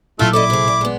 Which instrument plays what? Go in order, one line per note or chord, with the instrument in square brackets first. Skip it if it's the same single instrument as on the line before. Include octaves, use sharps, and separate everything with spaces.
[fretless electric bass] A1 A#2 F#3 [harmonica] A3 F4 E5 [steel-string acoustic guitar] E4
[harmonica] E4 D6 [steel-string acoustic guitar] A4 D5 D#5
[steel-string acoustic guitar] C3 G#4
D5
G#3 B3